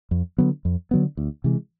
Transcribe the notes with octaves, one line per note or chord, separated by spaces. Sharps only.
F2
D3 F#3 B3
F2
D3 F#3 B3
D2
C3 E3 G#3